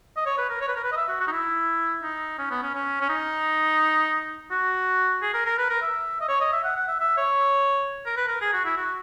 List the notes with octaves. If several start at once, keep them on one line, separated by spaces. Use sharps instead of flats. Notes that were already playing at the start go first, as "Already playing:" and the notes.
D#5
C#5
B4
A#4
C#5
B4
A#4
B4
D#5
E5
F#4
F#4
D#4
E4
D#4
C#4
B3
C#4
C#4
C#4
D#4
F#4
G#4
A#4
A#4
B4
A#4
E5
D#5
C#5
D#5
E5
F#5
F#5
E5
E5
C#5
A#4
B4
A#4
G#4
F#4
E4
F#4